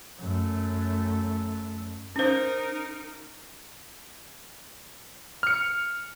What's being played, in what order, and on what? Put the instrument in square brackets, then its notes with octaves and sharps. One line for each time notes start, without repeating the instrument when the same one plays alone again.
[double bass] F#2 A3
[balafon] C#4 C5 [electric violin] D#4 A#4
[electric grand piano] F6 C#7